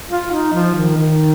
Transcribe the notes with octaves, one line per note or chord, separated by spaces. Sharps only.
F4
D#4
F3
D#3
D#3